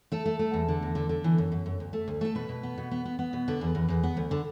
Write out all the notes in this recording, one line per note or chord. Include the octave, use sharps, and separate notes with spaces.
A3 A4
A3
A3
E2
D3
E2
D3
D3
E3
F#2
F#2
F#2
D2
A3
D2
A3 A4
B2 B4
B2
B3
B2
B3
B3
B3
B2
D3 B4
E2
E2
E2
B3
D2
D3